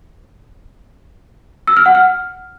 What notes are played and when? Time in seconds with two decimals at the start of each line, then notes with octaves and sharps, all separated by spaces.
1.67 E6
1.77 F6
1.86 F#5
1.95 F6